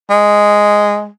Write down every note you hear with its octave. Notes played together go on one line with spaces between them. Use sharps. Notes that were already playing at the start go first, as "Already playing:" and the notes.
G#3